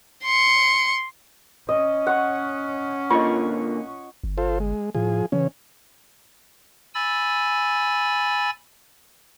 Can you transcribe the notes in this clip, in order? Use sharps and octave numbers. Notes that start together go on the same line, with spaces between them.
C6 C#7
C#4 D#5
F#5 C#6
A#2 D3 A#3 F4 D#5 C#6
G1
F4 A4 C5
G#3
A2 F3 G#4
C#3 E3 C#4
G#5 B5 E6 A6